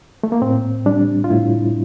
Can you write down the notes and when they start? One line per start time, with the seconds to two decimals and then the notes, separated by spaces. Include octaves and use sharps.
0.23 A3
0.32 A#3
0.42 A2 C4
0.86 G3 D4
1.24 F4
1.30 A2 E4